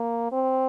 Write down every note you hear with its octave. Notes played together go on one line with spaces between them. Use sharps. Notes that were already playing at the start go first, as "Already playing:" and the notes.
Already playing: A#3
C4